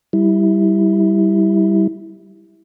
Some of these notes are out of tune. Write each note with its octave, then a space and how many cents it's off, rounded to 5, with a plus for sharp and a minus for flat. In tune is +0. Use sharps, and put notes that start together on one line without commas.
G3 -5 E4 -10